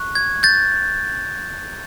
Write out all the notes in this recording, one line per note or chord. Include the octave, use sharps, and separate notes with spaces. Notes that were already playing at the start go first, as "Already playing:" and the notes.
Already playing: C#6 F#6
G#6
G6 A6